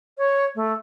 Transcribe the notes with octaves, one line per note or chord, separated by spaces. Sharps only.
C#5
A3